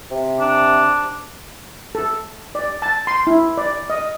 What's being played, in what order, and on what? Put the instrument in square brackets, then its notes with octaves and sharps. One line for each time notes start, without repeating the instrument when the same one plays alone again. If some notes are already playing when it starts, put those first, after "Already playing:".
[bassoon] C3
[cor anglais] D4
[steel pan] A4
D5
A5
C6
E4
D5
D#5